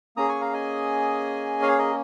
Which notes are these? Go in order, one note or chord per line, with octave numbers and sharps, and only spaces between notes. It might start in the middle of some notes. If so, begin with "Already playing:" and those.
A#3 C#4 G#4 A#5 D#6
G#5 C#6
F5 A#5
D#5 G#5
C#5 F5
A#4 D#5